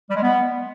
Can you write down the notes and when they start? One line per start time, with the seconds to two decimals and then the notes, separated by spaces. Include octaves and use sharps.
0.09 G3
0.16 G#3
0.22 B3